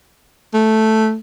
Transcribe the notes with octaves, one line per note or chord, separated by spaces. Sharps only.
A3